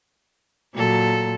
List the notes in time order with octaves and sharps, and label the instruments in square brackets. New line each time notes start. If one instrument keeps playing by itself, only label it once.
[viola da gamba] A#2 F#3 A4